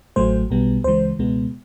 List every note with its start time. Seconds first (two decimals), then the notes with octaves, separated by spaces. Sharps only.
0.16 A1 A2 F#3 A3 C5
0.50 B1 B2 G3 B3
0.84 C#2 C#3 E3 G#3 C5
1.19 C#2 B2 G#3 B3